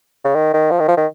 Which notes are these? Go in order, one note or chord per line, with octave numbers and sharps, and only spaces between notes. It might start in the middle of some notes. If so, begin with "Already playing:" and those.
C#3
D#3
D#3
F3
D#3
F3
D#3